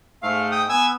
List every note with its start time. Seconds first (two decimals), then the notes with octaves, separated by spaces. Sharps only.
0.23 G#2 G#3 A3 F5
0.51 G5 D#6
0.69 B3 G#5 E6